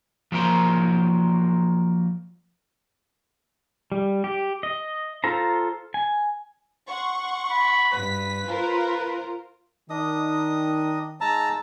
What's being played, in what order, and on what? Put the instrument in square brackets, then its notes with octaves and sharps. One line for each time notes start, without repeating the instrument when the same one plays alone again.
[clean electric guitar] F3 F#3 A#3 A#4 C5
[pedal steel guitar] G3
G4
D#5
F4 A4 C5 A#5
G#5
[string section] F#5 C6 C#6
[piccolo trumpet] B5
[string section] G2 B6 [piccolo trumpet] B4
[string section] F4 A#4 C5
[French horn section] D#3 [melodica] D4 D#5 D#6
[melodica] G#3 D#4 E6 [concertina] A5 A#5